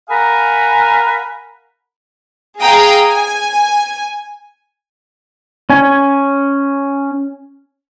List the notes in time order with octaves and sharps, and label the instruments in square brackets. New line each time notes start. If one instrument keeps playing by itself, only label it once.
[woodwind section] A#4 F5 F#5 G#5 A#5 B5
[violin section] G#4 F5 G5 A#5 D#6
G#5
[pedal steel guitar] C#4 G#5